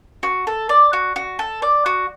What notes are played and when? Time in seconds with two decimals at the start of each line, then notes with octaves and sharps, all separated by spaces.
0.23 F#4
0.47 A4
0.69 D5
0.93 F#4
1.16 F#4
1.39 A4
1.62 D5
1.86 F#4